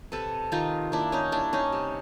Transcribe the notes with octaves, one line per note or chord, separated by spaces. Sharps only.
C3 A4 B4
D#3 D#4 F4
A#3 D4 E4
C#4 D#4
G3 D4 E4
C#4 D#4
C3